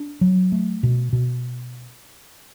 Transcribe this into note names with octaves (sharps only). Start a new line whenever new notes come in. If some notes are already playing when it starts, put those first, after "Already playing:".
Already playing: D4
F#3
A3
B2
B2